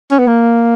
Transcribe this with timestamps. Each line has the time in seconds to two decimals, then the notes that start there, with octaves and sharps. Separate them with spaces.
0.11 C#4
0.19 B3
0.27 A#3